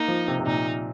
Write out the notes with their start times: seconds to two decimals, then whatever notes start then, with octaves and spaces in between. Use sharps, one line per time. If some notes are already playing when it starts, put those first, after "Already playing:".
Already playing: A#3 D#4
0.08 F3
0.28 C3
0.40 C3
0.46 A#2 D#4